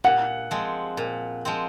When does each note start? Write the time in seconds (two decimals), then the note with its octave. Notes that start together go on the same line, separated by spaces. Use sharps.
0.04 A#2 F#5
0.51 F3 G#3 C4
0.97 A#2
1.45 F3 G#3 C4